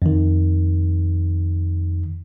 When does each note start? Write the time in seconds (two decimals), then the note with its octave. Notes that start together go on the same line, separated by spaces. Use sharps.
0.02 F2 D#3